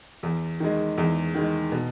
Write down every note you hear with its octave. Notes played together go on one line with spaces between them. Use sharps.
E2
D#3 G#3
E2
D#3 G#3
B2